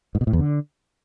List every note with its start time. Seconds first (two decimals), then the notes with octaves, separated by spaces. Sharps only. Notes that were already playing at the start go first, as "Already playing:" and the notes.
0.15 G#2
0.21 B2
0.27 A2
0.33 E2
0.39 D3